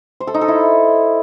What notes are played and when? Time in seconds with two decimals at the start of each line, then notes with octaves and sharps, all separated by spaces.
0.20 C5
0.27 A4
0.34 D#4
0.41 A4
0.48 E4